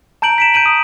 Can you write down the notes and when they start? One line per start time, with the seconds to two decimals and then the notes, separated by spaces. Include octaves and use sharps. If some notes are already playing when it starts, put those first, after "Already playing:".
0.22 A5 A#5 G6 D7 F#7
0.38 B6 D7 E7
0.54 G6 D7 D#7 F#7
0.66 D#6